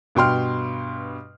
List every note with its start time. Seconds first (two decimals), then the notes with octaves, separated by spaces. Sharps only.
0.15 G2 B2 G5 C6 F6